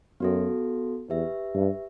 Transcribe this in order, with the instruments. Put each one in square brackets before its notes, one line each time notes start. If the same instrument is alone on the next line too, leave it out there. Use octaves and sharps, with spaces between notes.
[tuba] F#2 [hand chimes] B3 F#4 A4
[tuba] E2 [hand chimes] G4 B4 E5
[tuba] G2